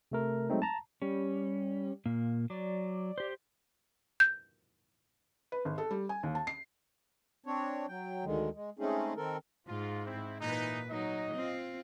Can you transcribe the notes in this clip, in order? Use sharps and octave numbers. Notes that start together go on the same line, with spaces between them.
C3 A3 A#4
F#3 G#3 A3 C4 D#4
A5 A#5
G3 C#4
A#2 A#3
F#3 D5
G4 C5
G6
B4
G#1
A4
G3
G#5
D#2
A5
C7
C4 D4 C#5
F#3 G5
D2 D3 D#3 G#3
G#3
G#3 A3 C4 C#4 D#4 G#4
D#3 C4 A4 A#4
G#2 F4
C4 E4
A#2 E3 D#4 B4
F#3 D#4 D#5
C4 F4